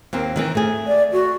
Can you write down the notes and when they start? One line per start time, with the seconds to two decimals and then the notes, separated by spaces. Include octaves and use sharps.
0.13 D#2 A#3 C4
0.36 D#3 E3 C4
0.55 A3 G#4
0.87 D5
1.12 F#4